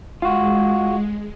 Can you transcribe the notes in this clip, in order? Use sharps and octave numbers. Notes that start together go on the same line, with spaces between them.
G#3 F4 F#4